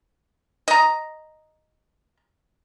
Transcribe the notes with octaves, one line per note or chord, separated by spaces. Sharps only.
D#5 A#5